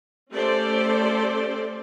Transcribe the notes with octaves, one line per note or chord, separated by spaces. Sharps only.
A3 C#4 G4 A4 C5 D5